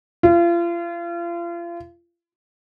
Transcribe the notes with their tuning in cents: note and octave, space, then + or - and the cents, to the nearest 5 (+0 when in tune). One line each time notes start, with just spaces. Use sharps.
F4 -35